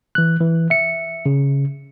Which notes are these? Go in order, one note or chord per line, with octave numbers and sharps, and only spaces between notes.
E3 F#6
E3
E5 C#7
C#3